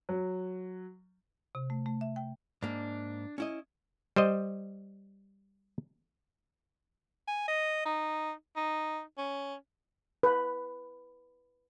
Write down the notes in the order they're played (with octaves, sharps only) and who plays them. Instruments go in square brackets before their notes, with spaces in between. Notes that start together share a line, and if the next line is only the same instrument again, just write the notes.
[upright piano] F#3
[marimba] C3
A3
A3
E5
G5
[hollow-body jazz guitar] G#2 A#3 [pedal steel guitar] D4
[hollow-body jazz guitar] C#4 E4 D#5
[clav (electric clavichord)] G3 C5 D#5
[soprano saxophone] G#5
D#5
D#4
D#4
C#4
[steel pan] B4